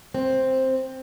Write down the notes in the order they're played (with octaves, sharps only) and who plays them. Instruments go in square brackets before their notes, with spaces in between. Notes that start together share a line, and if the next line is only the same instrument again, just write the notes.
[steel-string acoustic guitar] C4